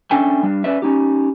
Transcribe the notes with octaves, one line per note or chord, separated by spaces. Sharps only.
C#4 D4 A4 E5 G5 G#5
G3 D4
C#4 B4 D5 E5
C#4 D#4 G4